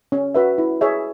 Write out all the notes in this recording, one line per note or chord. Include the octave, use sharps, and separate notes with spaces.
C#4
F#4 B4 E5
E4
G#4 C#5 E5